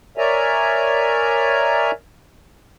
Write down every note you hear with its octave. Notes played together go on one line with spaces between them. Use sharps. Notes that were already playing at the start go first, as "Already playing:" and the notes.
A#4 C#5 D5 E5 G#5 A#5